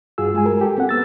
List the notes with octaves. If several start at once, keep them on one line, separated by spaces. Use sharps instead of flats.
G2 F4 F#4 G#4 E6
G#3 G#4 G#5
A#4
G4 A4
C4 F#5
B3 E6 A6